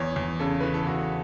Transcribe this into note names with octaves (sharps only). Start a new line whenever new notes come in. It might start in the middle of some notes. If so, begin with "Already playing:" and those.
Already playing: E2 C#5
E2
C#3 A4
E3 B4
A4
E2 F#4